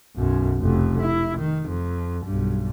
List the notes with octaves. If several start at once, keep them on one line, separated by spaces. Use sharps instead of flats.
B1 F#2
F1 F2
E4
D#3
F2
B1 G2